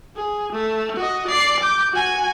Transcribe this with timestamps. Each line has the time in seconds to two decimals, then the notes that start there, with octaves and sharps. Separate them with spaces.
0.16 G#4
0.52 A3
0.97 F#4 D#5
1.27 D5 C7
1.60 D6 G6
1.91 F#4 G#5